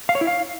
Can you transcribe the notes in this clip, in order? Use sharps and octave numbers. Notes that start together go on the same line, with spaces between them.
F5
C#5
E4
F5